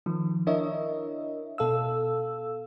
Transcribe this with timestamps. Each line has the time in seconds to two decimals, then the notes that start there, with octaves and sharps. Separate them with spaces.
0.06 D#3 F3
0.47 D4 E4 A#4 C#5 D#5 E5
1.58 B2 A4 F5 E6